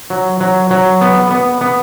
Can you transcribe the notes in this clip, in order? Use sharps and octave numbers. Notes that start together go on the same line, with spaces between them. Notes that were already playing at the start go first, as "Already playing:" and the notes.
F#3
F#3
F#3
B3
B3
B3